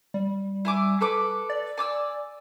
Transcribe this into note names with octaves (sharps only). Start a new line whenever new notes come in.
G3
E4 G#5 D6
A4 B4 D6
D5
G#5 D6 E6